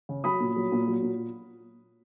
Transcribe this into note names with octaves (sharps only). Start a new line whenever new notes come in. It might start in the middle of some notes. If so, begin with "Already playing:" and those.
C#3
F#3 B5 D#6
A#2
F#3
A#2
F#3
A#2